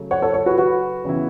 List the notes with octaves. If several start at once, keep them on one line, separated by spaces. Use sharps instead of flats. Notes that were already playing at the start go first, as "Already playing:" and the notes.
Already playing: C#3 F#3 A3
C#5 F#5
A4 C#5
A4 C#5
F#4 B4
F#4 B4
C#3 E3 B3 E4